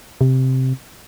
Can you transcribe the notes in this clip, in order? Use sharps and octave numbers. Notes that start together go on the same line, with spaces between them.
C3